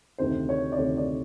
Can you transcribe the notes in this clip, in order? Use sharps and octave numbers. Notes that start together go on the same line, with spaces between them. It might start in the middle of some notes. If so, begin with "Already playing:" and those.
D2 C3 D#3 C5
C#5
D5
D2 C3 D#3 C#5
D5